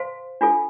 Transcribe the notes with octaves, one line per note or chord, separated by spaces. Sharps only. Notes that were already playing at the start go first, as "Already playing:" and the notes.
Already playing: C5 F5 A5 C6
D4 F4 A4